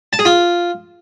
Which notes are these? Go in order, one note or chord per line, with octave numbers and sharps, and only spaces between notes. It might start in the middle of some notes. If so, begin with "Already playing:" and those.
A5
G#4
F4